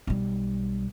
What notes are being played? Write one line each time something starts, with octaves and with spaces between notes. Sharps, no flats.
B1 G3